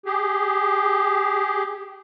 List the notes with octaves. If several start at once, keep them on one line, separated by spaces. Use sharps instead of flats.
G4 G#4